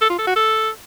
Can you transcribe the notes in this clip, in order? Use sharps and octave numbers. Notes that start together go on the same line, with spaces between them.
A4
F4
A4
F#4
A4